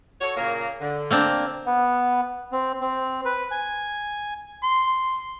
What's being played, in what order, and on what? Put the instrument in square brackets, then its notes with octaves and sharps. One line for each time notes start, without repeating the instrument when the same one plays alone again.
[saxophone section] F#4 A4 C#5
A#2 C#3 A#3
D3
[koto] A#3 C4 D4
[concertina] B3
C4
C4
B4
G#5
[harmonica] C6